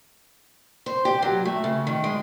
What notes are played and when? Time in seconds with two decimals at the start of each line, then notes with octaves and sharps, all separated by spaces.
0.86 C5
1.05 G4
1.22 F#3
1.45 A3
1.64 C#3
1.87 D#3
2.04 G#3